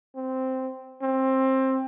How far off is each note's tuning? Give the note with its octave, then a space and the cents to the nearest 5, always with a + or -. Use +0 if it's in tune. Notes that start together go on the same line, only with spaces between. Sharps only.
C4 -5
C4 +20